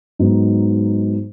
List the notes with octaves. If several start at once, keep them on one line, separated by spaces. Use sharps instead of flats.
G#2 F#3 B3 D#4